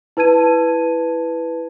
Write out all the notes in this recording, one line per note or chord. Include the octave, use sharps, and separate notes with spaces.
E4 B4 A5 G#6 D#7